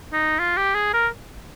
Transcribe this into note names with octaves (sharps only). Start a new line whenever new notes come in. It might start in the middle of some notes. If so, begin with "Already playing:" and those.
D#4
F4
G4
G#4
A#4